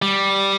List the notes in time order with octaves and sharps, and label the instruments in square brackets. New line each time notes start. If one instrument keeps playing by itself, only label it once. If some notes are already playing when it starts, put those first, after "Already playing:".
[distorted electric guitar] G3